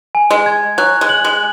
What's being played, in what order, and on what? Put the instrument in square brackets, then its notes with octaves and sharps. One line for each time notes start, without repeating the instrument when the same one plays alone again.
[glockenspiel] G#5
[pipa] G#3
[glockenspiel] G#6
[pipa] F#3 [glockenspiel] F#6
[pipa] G#3
[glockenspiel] F#7
[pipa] G#3